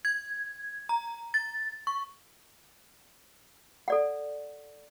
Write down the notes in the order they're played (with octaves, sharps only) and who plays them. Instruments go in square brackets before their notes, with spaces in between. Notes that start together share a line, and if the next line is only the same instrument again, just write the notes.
[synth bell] G#6
A#5
A6
C#6
[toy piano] A4 D5 F#5